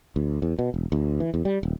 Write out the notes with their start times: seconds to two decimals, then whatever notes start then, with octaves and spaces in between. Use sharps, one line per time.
0.16 D2
0.42 E2
0.59 B2
0.74 E1
0.92 D2
1.20 E3
1.34 E2
1.45 G3
1.63 D#1